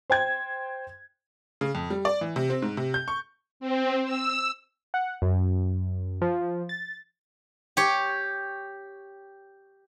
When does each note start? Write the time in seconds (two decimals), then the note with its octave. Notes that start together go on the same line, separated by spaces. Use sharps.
0.10 C5 G5 G#6
1.61 C#3
1.75 F2
1.90 G3
2.05 D5
2.21 E3
2.36 C3
2.50 C4
2.62 G#2
2.77 C3
2.94 G6
3.08 C#6
3.60 C4
4.04 E6
4.94 F#5
5.22 F#2
6.21 F3
6.69 A6
7.77 G4 C#5